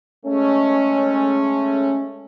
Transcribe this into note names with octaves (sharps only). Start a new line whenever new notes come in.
G#3 A3 C#4